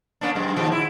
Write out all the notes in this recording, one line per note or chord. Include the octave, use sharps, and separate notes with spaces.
A#3 C#4 D4
F#2 G#3
D#2 A#2 F3
E4